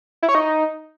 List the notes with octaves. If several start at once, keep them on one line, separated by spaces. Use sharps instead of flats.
E4
C#5
D#4